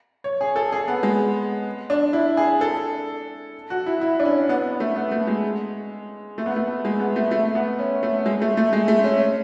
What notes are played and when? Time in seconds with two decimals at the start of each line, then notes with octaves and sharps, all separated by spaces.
0.24 C#5
0.41 G#4
0.56 A4
0.72 G#4
0.88 B3
1.03 G#3
1.90 D4
2.13 E4
2.37 G#4
2.61 A4
3.70 F#4
3.86 E4
4.01 E4
4.20 D4
4.25 C#4
4.49 B3
4.80 A3
4.96 B3
5.11 A3
5.27 G#3
6.38 A3
6.46 B3
6.56 A3
6.85 G#3
7.00 B3
7.16 A3
7.31 A3
7.55 B3
7.79 C#4
8.03 A3
8.26 G#3
8.42 A3
8.57 A3
8.73 G#3
8.88 A3
9.04 C#4
9.19 C#4